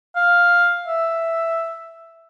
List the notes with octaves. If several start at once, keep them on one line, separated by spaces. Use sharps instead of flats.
F5
E5